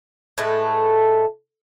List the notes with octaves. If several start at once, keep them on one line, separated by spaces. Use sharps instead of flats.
A2 G#3 A3 B4